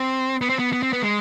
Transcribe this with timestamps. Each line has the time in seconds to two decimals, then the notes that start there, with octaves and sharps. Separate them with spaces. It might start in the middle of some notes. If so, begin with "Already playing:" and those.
Already playing: C4
0.41 B3
0.49 C4
0.59 B3
0.73 B3
0.83 C4
0.93 B3
1.02 G#3